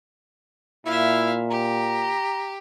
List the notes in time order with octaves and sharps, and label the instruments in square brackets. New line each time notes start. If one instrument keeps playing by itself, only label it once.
[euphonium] A#2 [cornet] E4 [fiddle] E5 F5
[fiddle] G4 [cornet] A#5